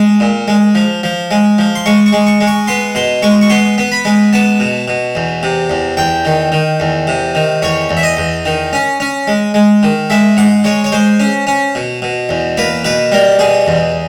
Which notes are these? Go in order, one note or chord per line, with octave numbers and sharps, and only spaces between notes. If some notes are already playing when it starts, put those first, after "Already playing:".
Already playing: G#3 A5
A#2
G#3
F3
F3
G#3
F3
C6
G#3 C#6
C#6
G#3
C#6
G#3
C#6
B3 C6
B2 C6
G#3 C#6
C#6
B3 C6
B3
B5
G#3
B3 A5
B2
B2
E2
C3
E2
E2 G5
D#3
D#3
E2
C3
D#3
E2 C#5
E2
E5
D#5
E2
D#3
C#4
C#4
G#3
G#3
D#3
G#3 E5
G#2 F#5
G#3 C#5
C#5
G#3 C5
C#4
C#4
B2
B2
E2
A#3 B4
B2 B4
G3 A#4
B2 G#4
E2